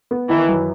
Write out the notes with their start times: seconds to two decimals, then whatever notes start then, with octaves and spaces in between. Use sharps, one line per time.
0.11 B3
0.30 D#3 E3
0.49 F#2